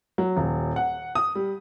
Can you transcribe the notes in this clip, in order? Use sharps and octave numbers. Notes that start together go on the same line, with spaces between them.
F#3
D#1
F#5
D#6
G3